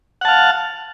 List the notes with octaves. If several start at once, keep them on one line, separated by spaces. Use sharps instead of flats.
F5 F#5 A5